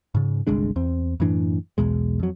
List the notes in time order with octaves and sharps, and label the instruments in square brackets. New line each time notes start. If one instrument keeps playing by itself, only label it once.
[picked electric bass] G#2 C#3
G1 C2 G#3 D4
E2 C4
F#2 A2 E3 D4
B1 E2 B2 G#3
F2 F#3